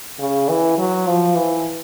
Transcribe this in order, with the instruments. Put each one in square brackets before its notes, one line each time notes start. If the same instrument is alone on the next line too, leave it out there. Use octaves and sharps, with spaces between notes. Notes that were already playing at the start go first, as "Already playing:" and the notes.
[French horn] C#3
E3
F#3
F3
E3